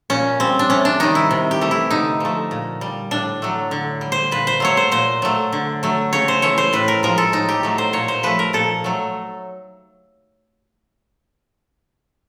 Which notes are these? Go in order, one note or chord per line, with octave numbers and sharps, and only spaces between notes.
A#2 C#4
G3 C4
D4
C3 C#4
D4
D#3 G3 D#4
E4
C3
G4
E3 A3
E4
D3 D#4
F3 A3
A#2
G3
A2 D4
F#3 A3
D3
G3
C5
A#2 B4
C5
F#3 A3 C#5
C5
A#2 C5
F#3 A3
D3
F#3 A3
C#3 C#5
C5
E3 A3 C#5
C5
A2 B4
A#4
F3 G#3 A#4
A4
A2 D#4
G4
F#3 A3
C5
A#2 C#5
C5
F3 A3 B4
A#4
A#2 A4
F#3 A3